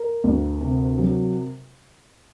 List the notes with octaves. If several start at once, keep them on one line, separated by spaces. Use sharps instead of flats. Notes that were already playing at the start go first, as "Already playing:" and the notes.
Already playing: A#4
D2
C3
F#3